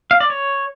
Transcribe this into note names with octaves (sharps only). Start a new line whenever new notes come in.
F5
D5
C#5